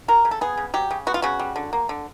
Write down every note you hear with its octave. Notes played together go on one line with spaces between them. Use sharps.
F#3 A#4
C#3
A4
B3 G#4
C#3
F#3 G4
C#3
B3 F#4
F4
C#3 F#4
G3
D3
A#3
D3